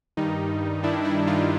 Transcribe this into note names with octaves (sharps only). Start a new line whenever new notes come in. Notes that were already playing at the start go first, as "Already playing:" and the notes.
G2 D#3 G3 D#4
G2 D#3 G3 D4 E4
D4 E4
D#4 F4